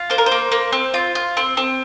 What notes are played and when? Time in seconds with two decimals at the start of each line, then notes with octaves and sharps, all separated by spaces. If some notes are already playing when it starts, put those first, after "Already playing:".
Already playing: F4
0.10 A#3 C5
0.18 A#4
0.26 C5
0.32 A#3
0.52 A#3
0.72 C4
0.94 F4
1.15 F4
1.37 C4
1.57 C4